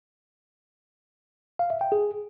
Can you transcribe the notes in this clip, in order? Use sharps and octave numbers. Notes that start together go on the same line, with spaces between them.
F5
E5
G5
G#4